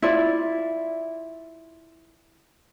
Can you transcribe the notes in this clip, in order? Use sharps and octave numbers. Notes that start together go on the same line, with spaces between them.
E4 F4 D5